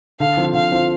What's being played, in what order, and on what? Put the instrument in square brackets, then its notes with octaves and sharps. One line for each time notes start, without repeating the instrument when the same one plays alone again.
[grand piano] D3 [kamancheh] F5
[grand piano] F3 C4 F4
[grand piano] D3 [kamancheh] F5
[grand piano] F3 C4 F4